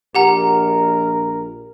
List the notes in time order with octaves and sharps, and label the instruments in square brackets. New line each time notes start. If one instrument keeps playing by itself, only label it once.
[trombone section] A#1 A#4 [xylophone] G4 F#5 A#5